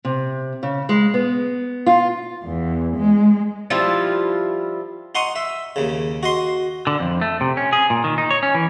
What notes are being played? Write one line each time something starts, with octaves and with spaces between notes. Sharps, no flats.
C3
C#3
G#3
B3
F4
E2
G#3
F3 G3 E4 F4
D#4 F#5 C6 C#6 D#6
E5
D#2 C#3
F#4 D#5 C6
D3
F2
A3
C3
C#4
G#4
A#2
D#3
D#4
C#5
C#4
E3